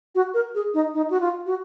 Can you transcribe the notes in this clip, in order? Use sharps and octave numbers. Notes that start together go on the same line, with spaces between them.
F#4
A#4
G#4
D#4
D#4
F#4
F4
F#4